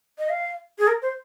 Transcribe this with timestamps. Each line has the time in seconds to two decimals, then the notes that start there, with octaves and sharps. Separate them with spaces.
0.19 D#5
0.30 F5
0.79 G#4
0.88 A#4
1.02 C5